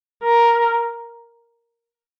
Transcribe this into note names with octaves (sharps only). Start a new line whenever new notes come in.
A#4